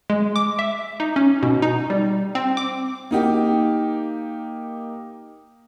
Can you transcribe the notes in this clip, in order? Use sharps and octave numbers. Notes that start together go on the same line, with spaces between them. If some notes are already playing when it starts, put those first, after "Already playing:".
G#3
D6
E5
D#4
C#4
B2
D#4
G3
C4
D6
A#3 D#4 G4